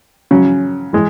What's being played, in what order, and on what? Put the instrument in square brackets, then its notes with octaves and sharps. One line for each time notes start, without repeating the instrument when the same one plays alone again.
[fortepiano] C#3 F#3 C#4
E3 G#3